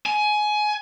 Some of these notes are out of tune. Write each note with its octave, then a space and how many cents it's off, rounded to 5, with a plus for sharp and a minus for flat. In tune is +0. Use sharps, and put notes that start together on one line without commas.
G#5 +20